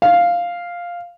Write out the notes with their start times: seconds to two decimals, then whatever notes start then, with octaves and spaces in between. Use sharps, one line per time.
0.02 F5